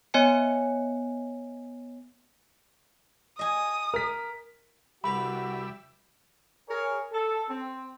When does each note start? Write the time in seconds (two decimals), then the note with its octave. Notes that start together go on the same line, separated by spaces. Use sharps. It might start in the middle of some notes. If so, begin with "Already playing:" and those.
0.14 B3 C#5 D#5 G#5 C#7
3.39 D#5 G#5 D#6
3.94 A#4 B6
5.04 C2 G3 F#4 B4 E5 A#5 B5
6.69 G#4 A#4 C#5
7.12 A4
7.49 C4